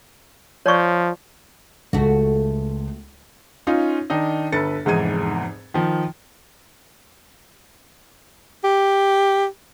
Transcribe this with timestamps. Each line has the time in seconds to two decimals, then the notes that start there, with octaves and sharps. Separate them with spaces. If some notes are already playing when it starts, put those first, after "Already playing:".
0.66 F3 C#5 D5 C#6
1.93 C#2 A3 F#4
3.67 C#4 D#4 F4
4.10 D#3 D4 D#4 D#5
4.52 G1 A4 B4 A6 C#7
4.85 F1 E2 G#2 D#4 G#6 D#7
5.74 D#3 F3
8.64 G4